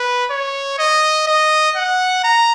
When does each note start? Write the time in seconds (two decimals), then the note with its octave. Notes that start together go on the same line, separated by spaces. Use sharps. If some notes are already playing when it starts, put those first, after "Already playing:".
Already playing: B4
0.30 C#5
0.79 D#5
1.27 D#5
1.76 F#5
2.24 A#5